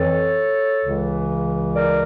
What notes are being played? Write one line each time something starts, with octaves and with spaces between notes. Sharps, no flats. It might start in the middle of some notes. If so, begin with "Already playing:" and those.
Already playing: F2 E3 A4 C#5
C#2 C#3 E3
A#4 D5